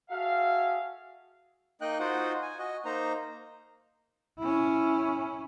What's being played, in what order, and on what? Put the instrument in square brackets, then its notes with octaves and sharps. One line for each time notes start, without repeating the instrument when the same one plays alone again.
[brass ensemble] F#4 G#4 A4 E5 F5
[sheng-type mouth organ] A#3 D#4 D#5 G5 F#6
D#4 F4 F#4 C5 F#5
G#5
F#4 D#5
A#3 D#4 C5 A#5
[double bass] C#4 E4